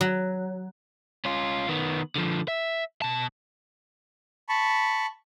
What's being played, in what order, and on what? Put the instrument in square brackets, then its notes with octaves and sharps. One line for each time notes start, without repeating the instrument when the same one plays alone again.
[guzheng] F#3
[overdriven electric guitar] C#4 F4
D#3 B3
D3 F3
E5
B2 A5
[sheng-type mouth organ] A5 B5 C#6